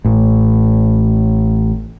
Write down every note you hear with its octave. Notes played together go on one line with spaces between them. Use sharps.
A1 A2